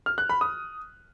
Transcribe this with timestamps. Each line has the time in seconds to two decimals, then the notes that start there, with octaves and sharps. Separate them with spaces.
0.06 F6
0.18 F#6
0.29 B5
0.41 D#6